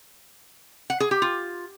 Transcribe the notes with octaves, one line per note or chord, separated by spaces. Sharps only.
F#5
G#4
G4
F4